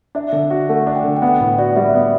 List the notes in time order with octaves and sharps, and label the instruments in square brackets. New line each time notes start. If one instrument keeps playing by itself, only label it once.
[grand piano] D4 [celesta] E5
[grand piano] D3
F#4
[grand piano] A3 [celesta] F#5
[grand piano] D4
[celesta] G5
[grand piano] D3
[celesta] G5
[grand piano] B3 [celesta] F#5
[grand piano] A2
[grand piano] F#4 [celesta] D5
[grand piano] G3 [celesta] E5
[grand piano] B3 [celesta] D5
[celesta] E5